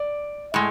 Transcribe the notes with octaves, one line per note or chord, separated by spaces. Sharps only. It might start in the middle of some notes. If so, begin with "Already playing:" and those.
Already playing: D5
A2 G#3